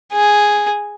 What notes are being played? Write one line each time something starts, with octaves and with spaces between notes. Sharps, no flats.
G#4